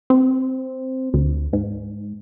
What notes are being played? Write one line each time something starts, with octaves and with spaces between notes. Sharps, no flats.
C4
D2
G#2